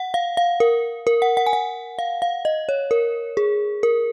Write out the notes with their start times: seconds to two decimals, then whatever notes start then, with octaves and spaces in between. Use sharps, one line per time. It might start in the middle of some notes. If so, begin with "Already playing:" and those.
Already playing: F#5
0.14 F5
0.37 F5
0.60 A#4
1.07 A#4
1.22 F#5
1.37 F#5
1.47 G#5
1.53 F#5
1.99 F5
2.22 F5
2.45 D#5
2.69 C#5
2.91 A#4
3.37 G#4
3.83 A#4